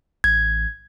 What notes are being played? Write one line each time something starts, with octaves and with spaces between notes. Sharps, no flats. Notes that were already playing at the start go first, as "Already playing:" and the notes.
A1 G#6